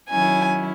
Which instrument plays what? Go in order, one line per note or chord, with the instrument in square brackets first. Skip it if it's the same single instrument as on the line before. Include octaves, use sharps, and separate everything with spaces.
[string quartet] D#3 F#3 C#4 E4 G#5